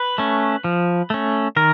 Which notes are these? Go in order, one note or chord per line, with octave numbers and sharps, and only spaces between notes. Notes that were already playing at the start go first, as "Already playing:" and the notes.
Already playing: B4
A3 C#4
F3
A3 C#4
D#3 A#4